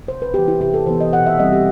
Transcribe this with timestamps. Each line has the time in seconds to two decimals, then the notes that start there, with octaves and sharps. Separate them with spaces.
0.08 C3 C5
0.22 B4
0.34 E3 B3 G4
0.48 E4
0.60 C3 G4
0.74 A4
0.87 E3 B3 C5
1.00 D#5
1.13 B2 F#5
1.26 E5
1.39 G3 C4 D#5
1.52 G4